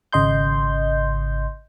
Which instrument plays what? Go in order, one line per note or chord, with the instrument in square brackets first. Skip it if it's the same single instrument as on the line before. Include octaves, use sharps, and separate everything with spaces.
[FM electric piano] G#1 C#3 D#5 C6 G6